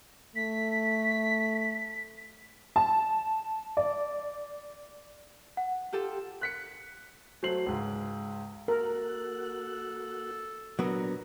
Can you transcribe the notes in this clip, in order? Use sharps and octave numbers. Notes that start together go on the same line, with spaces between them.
A3 B6
A5
D5
F#5
F4 G4 A4
F#6 B6 C#7
F#3 A3 C5 C7 F#7
C#2 G#2
A#3 F#4 A4 A#4 F#6
A#2 F#3 B3 D4 A#4 A#5